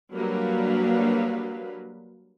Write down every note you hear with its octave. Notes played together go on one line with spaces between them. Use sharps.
F#3 G3 A#3 D4 B4 F5